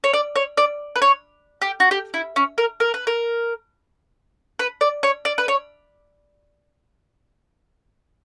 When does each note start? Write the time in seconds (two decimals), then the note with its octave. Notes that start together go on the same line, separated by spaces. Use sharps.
0.04 C#5
0.13 D5
0.36 C#5
0.57 D5
0.96 B4
1.02 C#5
1.62 G4
1.80 F#4
1.91 G4
2.14 E4
2.36 C#4
2.58 A#4
2.80 A#4
2.94 B4
3.07 A#4
4.59 B4
4.81 D5
5.03 C#5
5.25 D5
5.38 B4
5.48 C#5